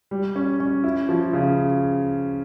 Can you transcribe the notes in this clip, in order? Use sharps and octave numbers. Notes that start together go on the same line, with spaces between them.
G3
C#4
C#4
E4
F3
C#3